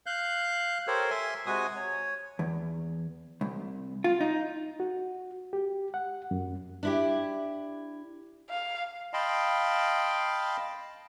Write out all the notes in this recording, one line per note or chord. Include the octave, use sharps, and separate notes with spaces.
F5 F#6 G6
G4 A4 A#4 C5 C#5
E5 G#5 C6
C3 G#3 F#4 G#5 D#6
C#5
E2
C2
F4
D#4
F#4
G4
F#5
F#2
D4 E4 G4
F5
D#5 F5 G5 A5 B5 C6